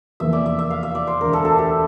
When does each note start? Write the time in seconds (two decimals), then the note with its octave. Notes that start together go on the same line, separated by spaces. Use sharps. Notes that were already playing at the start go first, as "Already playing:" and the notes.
0.20 F1 E2 E3 A#3 E5
0.33 D5
0.46 E5
0.59 E5
0.71 F5
0.83 E5
0.95 D5
1.07 C5
1.21 E1 D2 D3 A#4
1.33 A4
1.45 A4
1.58 G4